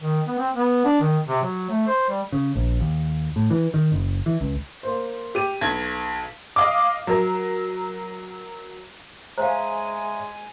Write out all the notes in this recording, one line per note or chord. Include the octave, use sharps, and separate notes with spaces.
D#3
B3
C4
B3
D4
D#3
C3
F#3
A3
C5
G3
C#3
A#1
D#2
A2
E3
D#3
F#1
E3
C#2
A#3 C5
G4 D#7
B1 G#6
D#5 F5 D6
F#3 A#4
G#3 C5 C#5 E5 F5 G#5 A#5